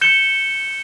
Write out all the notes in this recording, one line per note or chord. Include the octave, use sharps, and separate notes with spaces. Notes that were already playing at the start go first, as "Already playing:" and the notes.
G6 C#7 E7 G7